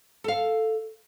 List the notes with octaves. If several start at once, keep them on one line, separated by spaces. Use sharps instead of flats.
A4 F5